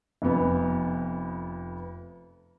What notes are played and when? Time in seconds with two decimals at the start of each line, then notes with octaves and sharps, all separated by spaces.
0.22 F1 F2 B3